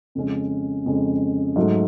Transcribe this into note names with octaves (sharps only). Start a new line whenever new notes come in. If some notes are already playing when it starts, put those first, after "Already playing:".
F2 C#3 G#3 C#4
F2 C#3 G#3 C#4
G#2 F#3 A3